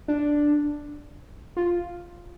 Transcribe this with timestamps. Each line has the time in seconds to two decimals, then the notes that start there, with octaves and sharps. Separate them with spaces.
0.08 D4
1.57 F4